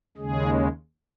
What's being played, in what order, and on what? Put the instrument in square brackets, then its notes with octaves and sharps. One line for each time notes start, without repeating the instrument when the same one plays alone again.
[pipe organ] D#2 C#3 G#3 G#4